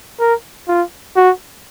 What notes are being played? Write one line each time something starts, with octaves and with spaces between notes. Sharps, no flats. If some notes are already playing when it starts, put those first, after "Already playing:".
A#4
F4
F#4